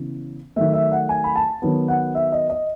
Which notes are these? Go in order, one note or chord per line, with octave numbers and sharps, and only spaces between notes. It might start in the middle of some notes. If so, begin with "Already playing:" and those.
Already playing: C#3 E3 B3
D#3 F#3 A3 E5
E5
F#5
G#5
B5
A5
D#3 F#3 B3
F#5
E5
D#5
D#5